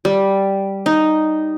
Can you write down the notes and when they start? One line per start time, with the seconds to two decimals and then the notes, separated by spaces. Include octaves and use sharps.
0.05 G3
0.86 D#4